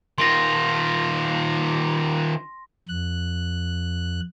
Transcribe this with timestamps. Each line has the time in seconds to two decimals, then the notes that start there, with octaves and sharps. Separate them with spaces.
0.18 D#3 F4 C6 A#6
2.89 F2 F#6